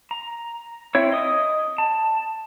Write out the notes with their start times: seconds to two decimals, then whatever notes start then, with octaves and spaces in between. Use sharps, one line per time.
0.11 A#5
0.95 C4 E4 C#5
1.12 D#5 D#6
1.78 A5